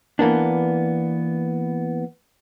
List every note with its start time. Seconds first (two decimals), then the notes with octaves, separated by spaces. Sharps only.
0.19 E3 A#3 B3 D4